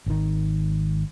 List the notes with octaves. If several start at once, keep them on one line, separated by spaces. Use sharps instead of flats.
G#1 D#3